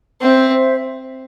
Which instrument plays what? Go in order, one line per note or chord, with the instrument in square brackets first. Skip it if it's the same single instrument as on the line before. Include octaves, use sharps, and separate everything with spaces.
[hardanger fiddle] C4 [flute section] E5
[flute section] C5